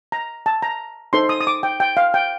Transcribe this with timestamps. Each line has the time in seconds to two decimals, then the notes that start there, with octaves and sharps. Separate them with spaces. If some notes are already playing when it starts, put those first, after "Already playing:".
0.12 A#5
0.46 A5
0.62 A#5
1.13 D#4 A4 C5 C6
1.29 D#6
1.41 D#6
1.47 D6
1.63 G5
1.80 G5
1.97 F5
2.14 G5